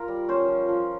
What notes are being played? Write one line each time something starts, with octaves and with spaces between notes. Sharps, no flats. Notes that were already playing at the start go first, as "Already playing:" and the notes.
Already playing: F4 A#4
G3
C#4 C5
F3
F3